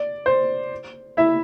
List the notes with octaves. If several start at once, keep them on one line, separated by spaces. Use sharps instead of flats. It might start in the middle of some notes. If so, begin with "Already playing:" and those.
Already playing: D5
C5
E4 E5